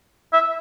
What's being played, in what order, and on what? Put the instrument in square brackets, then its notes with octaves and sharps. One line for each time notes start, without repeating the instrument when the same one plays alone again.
[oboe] E5